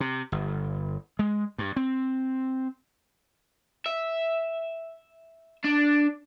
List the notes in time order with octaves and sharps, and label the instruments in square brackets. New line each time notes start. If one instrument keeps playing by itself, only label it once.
[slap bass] C3
G1
G#3
G2
C4
[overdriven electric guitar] E5
D4